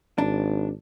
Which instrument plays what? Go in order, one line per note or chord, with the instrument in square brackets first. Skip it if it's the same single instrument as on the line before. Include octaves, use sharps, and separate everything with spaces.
[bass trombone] G#1 [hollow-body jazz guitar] D4